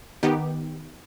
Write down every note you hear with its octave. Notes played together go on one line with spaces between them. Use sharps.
D#3 B3 D#4 G4